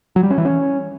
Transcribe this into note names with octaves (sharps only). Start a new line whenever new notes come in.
F#3
G3
C#4
E3
C#4